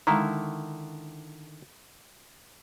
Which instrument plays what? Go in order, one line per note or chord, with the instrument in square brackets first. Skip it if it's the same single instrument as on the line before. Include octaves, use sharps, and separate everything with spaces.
[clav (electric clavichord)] D3 D#3 E4 [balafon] G#3 A#5